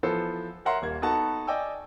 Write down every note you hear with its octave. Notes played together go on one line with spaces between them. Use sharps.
E3 F3 B3 A4 C5
A#4 C#5 E5 F#5 A#5 C6
D#1 A#3 G#6
B3 D#4 F#4 A4 F#5 A5
D5 D#5 G5 G#5 D6 E6